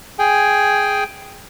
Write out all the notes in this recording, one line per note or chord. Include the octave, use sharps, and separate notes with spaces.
G#4 G5 G#5